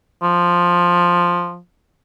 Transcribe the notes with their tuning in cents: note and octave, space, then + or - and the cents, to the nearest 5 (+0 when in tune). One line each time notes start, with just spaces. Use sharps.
F3 +5